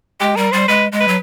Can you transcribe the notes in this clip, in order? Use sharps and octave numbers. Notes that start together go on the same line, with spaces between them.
G#3 G4
G3 A#4
G3 C5
G#3 B4
G#3
B4
F#3